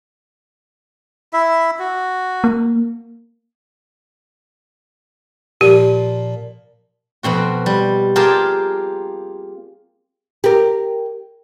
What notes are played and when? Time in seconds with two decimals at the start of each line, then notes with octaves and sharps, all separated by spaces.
1.33 E4 E5
1.79 F#4
2.44 A#3
5.61 A#2 F3 G4
7.23 F2 B2 C4 F#4
7.66 G3
8.16 A#3 F4 G4 G#4 A#4 A5
10.44 G4 A#4